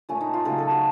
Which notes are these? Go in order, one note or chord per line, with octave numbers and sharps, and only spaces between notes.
A#2 A3 C#4
D#4
F4
C#3 F#3 A3 A4
A4
F#4